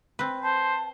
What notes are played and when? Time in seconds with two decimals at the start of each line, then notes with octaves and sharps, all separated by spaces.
0.19 C4 B4
0.43 C5 A5